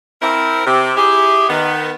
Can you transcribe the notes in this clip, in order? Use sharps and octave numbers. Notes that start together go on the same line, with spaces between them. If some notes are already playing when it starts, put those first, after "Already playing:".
C4 E4 A#4
C3
E4 G4 G#4
D#3 B3